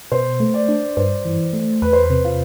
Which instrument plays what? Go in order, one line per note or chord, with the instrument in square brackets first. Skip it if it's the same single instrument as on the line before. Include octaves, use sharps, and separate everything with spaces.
[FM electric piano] B2 [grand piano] C5
[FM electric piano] A3
[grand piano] D5
[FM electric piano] D4
[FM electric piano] G2 [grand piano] C5
[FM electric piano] E3
A3
[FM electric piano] E2 [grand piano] B4
[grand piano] C5
B4
[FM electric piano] C3
[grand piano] F4